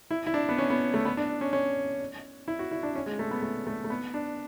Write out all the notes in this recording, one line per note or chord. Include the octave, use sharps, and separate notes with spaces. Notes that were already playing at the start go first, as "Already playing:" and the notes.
E4
E4
D4
B3
C#4
B3
A3
B3
D4
C#4
C#4
E4
F#4
E4
D4
C#4
G#3
A3
B3
A3
A3
A3
B3
D4